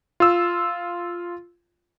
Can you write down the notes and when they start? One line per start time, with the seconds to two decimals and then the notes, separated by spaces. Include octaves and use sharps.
0.20 F4 E6